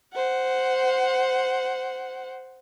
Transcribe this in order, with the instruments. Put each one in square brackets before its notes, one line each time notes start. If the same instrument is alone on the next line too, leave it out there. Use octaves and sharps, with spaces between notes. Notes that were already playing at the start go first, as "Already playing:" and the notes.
[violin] C5 F#5